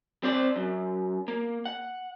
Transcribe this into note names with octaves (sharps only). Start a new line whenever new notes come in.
C4 C5 D5
F#2
A#3
F#5